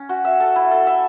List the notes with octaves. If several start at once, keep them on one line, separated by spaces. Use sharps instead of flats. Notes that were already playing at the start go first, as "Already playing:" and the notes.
Already playing: C#4
F#4
E5
A4
E4
A4
E5